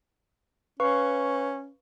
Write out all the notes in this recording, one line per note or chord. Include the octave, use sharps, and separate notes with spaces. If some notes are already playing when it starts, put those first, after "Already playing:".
C#4 B4 F5 C#6